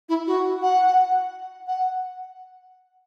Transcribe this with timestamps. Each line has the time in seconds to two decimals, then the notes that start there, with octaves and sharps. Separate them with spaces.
0.09 E4
0.27 F#4
0.62 F#5
1.67 F#5